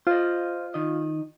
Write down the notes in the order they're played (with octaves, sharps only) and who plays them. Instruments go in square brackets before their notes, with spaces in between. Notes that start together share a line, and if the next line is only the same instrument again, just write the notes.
[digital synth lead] F4 [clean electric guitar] C5 D#5
[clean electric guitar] D#3 D#5